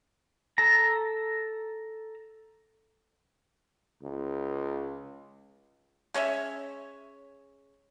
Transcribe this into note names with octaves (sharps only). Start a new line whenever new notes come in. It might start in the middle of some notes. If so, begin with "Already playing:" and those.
A4 A#5
C#2
G#3 C#4 C#5 E5